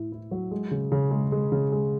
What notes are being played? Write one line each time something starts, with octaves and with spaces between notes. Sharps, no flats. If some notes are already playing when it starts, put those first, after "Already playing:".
Already playing: A2 E4
E4
F#3
G#3
C#3
C#3
G#3
G#3
C#3
G#3